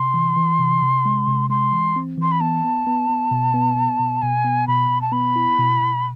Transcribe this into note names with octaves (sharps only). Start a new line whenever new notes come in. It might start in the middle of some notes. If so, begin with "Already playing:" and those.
Already playing: C3 C6
E3
E3
C3
C3
G#3
C3
G#3 C6
E3
C4
E3 C6
B5
B3 A5
B3
B3
B3
B2
B3
B3
B2
B2 G#5
B3
B2 B5
B2
A5
B3 B5
E4
B2
B2